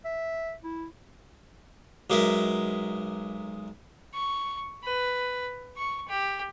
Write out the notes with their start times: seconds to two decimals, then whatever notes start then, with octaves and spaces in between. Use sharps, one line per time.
0.05 E5
0.64 E4
2.10 B1 G#3 A#4 E5
4.14 C#6
4.84 B4
5.77 C#6
6.09 G4